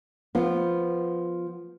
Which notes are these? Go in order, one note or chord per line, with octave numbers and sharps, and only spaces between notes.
F3 B3